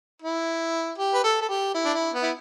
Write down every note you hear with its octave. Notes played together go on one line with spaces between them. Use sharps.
E4
G4
B4
A4
A4
G4
E4
D4
E4
B3
E4